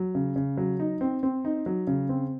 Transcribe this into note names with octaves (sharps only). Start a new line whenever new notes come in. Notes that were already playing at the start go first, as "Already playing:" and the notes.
Already playing: F#3
C#3
C#3
F#3
D#4
C4
C4
D#4
F#3
C#3
C4